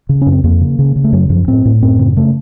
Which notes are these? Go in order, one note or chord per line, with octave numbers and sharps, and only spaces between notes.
C#3
F#2 C#4
C4
F2 A#3
C#3
C#3
C#3
A3
F#2 F#3
F#2 F3
A2 C4
A2
F#2 C4
C#3
C#3 A3